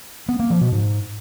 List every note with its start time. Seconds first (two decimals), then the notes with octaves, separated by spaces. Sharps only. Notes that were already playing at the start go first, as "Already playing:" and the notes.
0.29 B3
0.39 A#3
0.50 F3
0.61 B2
0.72 G#2